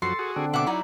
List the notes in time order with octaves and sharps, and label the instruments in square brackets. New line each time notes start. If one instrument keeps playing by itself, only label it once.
[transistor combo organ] F#2 F3 F#4 [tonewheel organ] A4 [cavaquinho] C6
[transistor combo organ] F#4 G#4
[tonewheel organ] D3 C4 D4
[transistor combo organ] B2 E5 [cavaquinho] F#5 D6
[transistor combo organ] F#3 E4 [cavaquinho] D#4 D5